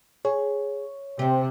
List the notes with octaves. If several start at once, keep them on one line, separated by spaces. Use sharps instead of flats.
G#4 C#5
C3 C4 G4